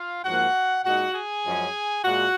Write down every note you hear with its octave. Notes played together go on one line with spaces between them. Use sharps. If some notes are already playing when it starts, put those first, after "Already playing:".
Already playing: F4 F5
G#2 F3 A#3 F#4 F#5
A#2 G#3 D#4 F#4 F#5
G#4 G#5
F#2 F3 G#3 C#4
A#2 G#3 F#4 F#5